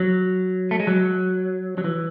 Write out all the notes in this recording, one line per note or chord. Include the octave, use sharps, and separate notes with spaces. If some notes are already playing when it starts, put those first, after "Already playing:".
Already playing: F#3
A3
G#3
F#3
F#3
E3